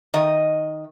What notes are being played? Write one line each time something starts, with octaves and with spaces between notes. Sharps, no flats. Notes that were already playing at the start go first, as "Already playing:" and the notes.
D#3 D#5